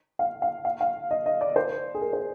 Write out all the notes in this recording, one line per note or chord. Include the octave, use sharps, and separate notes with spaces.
F5
F5
F5
F5
D#5
D#5
D5
C5
G#4
A#4
C5